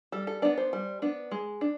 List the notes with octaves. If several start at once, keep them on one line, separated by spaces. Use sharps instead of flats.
G3 A4
A4
B3 D4 D5
C5
G3
B3 D4
G#3
D4